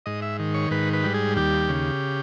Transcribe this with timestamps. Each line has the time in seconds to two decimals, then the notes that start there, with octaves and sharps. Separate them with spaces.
0.06 G#2 D#5
0.22 E5
0.39 D#3
0.54 C#5
0.71 G#2 B4
0.93 B4
1.03 G3
1.14 G#4
1.36 D#2 G4
1.69 C#3